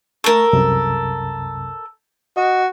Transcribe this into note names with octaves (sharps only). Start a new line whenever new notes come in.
A3 A4 A#4 C#6
C2 F#2 C3
F#4 D#5